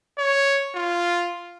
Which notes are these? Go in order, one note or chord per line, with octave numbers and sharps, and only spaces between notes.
C#5
F4